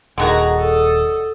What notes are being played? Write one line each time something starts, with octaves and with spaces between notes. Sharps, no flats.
D#1 D3 D#3 F#4 G#4 A#5
A4 D#6